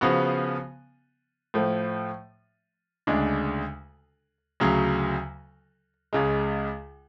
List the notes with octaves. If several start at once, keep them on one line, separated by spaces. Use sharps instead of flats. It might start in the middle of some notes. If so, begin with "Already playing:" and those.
C#3 F3 B3 F#4
A2 F3 A3
D2 C#3 G#3 D4
D2 C#3 F#3
C#2 C#3 G#3